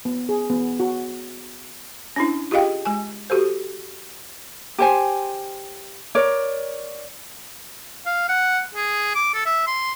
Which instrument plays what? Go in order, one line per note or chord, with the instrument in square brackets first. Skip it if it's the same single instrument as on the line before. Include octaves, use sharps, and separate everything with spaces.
[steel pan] B3
G#4
B3
F#4
[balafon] C#4 D4 E4
F4 G4 G#4 D#5 F5 G5
G#3 G#5
F#4 G4 A4 C5
[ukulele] G4 C5 G#5
A#4 C#5 D5
[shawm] F5
F#5
G#4
D6
A4
E5
C6